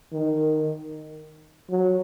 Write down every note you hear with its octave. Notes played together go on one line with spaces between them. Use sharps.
D#3
F#3